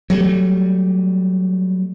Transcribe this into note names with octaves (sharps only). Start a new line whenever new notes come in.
F#3 G3 A3